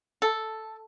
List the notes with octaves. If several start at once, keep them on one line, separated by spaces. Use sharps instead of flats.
A4